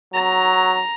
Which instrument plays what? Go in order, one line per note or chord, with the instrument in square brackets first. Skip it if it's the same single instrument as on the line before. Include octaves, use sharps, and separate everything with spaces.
[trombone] F#3 [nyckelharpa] A#5